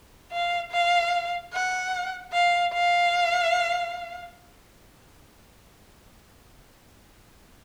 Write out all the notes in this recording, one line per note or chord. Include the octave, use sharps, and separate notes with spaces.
F5
F5
F#5
F5
F5